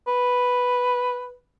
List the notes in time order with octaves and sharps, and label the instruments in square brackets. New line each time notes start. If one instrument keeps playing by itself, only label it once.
[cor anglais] B4